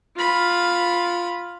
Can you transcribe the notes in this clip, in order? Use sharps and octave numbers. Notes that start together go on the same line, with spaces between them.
F4 B5